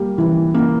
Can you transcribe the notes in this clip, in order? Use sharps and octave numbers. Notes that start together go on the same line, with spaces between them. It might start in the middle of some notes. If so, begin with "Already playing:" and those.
Already playing: G3 A#3
E3
A#3